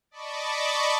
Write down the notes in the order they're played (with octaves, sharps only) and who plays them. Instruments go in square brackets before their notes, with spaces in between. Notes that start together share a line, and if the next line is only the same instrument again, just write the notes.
[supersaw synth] D5 D#5 A5 B5 C#6 D6